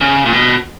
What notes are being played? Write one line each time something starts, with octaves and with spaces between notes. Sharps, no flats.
C#3
A#2
B2